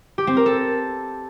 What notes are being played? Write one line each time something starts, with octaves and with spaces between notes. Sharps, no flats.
G4
C4
A#4
A4